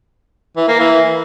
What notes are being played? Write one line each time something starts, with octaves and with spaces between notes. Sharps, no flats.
E3
A#3
E3